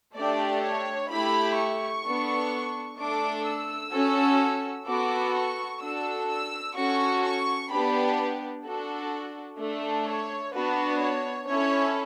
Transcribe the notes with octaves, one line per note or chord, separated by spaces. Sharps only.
A3 D4 G4 D5
C#5
A3 E4 G4 B5
C#6
B3 D4 A4
A3 D4 A4 D6
E6
C#4 F#4 A4
B3 F#4 A4 D6
C#6
D4 F#4 A4 E6
E6
C#4 F#4 A4 C#6
C#6
B3 D4 G4 B5
D4 F#4 A4
A3 D4 A4
C#5
B3 D4 F#4 B4
C#5
C#4 E4 A4 C#5